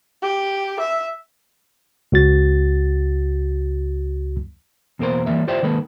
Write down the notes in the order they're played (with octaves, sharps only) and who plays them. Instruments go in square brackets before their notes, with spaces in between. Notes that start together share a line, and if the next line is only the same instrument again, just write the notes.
[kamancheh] G4
E5
[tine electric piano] C#2 F#4 A6
[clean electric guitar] E2 B2 A#3 D#4 A#4 C5
E3 G3 A#3 E5
F4 G4 C5 D5 E5 G5
D#3 G#3 A#3 A4 B4